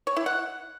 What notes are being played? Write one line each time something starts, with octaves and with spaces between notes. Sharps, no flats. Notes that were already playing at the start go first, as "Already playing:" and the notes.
C#5
E4
F#5